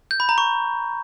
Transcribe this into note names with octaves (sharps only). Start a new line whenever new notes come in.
G6
B5
A#5
C#6